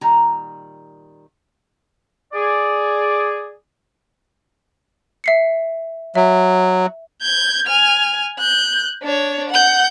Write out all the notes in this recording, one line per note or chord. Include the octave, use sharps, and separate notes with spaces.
A#2 D#3 G3 A#5
G#4 D5
E5 C7 C#7
F#3 E5
G6 G#6
G#5 F6
F#6 G6
D4 C#5
F#5 G6